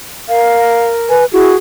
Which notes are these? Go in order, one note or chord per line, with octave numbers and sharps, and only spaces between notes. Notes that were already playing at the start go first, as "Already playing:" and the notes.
A#4 F5
B4 G#5
E4 F#4 G#4